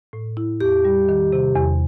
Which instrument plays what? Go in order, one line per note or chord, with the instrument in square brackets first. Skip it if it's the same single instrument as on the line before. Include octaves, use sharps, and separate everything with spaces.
[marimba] A2
E4
[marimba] E2 [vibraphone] G4
[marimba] G3
D#3
C3
E2